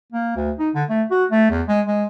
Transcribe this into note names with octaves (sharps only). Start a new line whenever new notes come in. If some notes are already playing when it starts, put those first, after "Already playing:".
A#3
D2
D#4
D3
A3
F#4
A3
E2
G#3
G#3